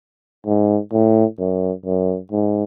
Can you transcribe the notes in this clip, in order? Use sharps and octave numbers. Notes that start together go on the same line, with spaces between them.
G#2
A2
F#2
F#2
G#2